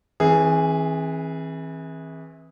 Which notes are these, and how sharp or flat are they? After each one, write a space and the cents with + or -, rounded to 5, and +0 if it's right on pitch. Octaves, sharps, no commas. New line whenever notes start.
E3 -25 C4 +30 G#4 +0